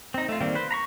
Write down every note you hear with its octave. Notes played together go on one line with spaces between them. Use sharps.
C4 D#4
A3 F4
D#3 G3 A#3 C4
B4 C5
A#5 B5 C#6